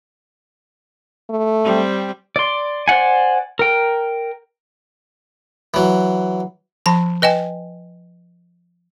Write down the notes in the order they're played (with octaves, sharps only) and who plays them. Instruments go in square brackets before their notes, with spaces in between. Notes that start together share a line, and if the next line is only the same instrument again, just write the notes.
[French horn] A3
[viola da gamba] G3 C4
[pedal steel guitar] D5 C6
C5 D5 F#5 G#5
A#4 G5
[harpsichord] E3 F#3
[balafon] F3 A5 B5
B4 D#5 G5 G#5